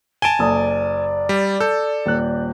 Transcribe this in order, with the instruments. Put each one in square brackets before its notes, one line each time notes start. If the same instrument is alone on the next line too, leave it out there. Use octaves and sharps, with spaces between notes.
[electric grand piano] G#5 A5 [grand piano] D7 G7
[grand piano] F#1 A4 D#6 [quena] D5
[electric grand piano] G3
[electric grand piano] A4 [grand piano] G6
[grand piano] D#1 F#6